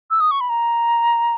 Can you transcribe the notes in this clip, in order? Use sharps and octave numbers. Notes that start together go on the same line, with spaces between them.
E6
D#6
C#6
B5
A#5